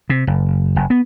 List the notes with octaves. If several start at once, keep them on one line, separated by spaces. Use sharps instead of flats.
C3
F#1
F#1
B3